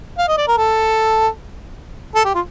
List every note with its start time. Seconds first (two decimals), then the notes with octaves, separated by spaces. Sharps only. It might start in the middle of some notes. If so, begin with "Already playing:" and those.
0.18 F5
0.28 D#5
0.38 D5
0.48 A#4
0.57 A4
2.15 A4
2.25 G4
2.35 F4